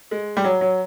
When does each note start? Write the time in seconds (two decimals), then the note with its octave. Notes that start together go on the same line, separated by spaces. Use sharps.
0.11 G#3
0.37 G3
0.44 F#3
0.61 F#3